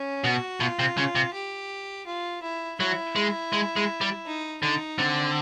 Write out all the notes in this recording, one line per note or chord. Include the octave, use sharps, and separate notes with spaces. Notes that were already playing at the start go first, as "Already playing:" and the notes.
Already playing: C#4
B2 F#4
B2 F4
C3
C#3
C3
G4
F4
E4
F#3 E4
G#3
G#3
G#3
G3
D#4
D3 D#4
D3 C4